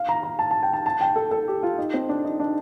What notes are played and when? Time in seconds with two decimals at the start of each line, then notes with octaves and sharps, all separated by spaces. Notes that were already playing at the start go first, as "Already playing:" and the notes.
Already playing: F5
0.09 A#5
0.23 A#5
0.39 A5
0.51 A5
0.63 G5
0.73 A5
0.86 A5
1.01 G5
1.16 A4
1.31 A4
1.48 G4
1.63 F4
1.78 D#4
1.94 C4
2.09 D4
2.24 D#4
2.40 D4